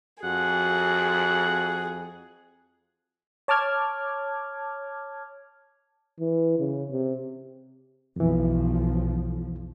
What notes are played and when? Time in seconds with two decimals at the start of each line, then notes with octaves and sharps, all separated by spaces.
0.24 F2 F#4 G#4 F#5
3.48 C#5 A5 D6 F6 G#6
6.20 E3
6.59 C#3
6.91 C3
8.16 B1 F2 E3 F3